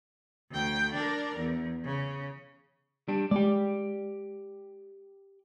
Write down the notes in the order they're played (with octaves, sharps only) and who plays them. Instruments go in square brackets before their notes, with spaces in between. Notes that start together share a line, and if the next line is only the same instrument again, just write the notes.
[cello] D2 G5
D4 A#4
E2
C#3
[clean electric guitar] G3 D4
[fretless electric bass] G#3 [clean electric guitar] G4 D5